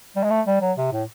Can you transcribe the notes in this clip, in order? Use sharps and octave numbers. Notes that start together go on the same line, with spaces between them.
G3
G#3
A3
G3
F#3
C3
A2